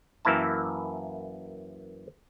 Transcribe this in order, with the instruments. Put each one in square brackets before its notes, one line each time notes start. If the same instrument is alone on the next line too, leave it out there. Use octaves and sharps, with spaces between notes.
[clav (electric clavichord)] F#2 E3 A#3 E4 A5